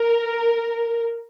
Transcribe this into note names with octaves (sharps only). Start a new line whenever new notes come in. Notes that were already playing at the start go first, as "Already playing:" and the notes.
Already playing: A#4